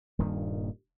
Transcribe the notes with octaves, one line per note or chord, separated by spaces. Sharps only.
D#1 G2 A#2 D#3